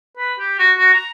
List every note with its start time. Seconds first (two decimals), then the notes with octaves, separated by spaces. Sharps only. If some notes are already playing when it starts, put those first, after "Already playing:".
0.17 B4
0.39 G4
0.59 F#4
0.78 F#4
0.94 A#5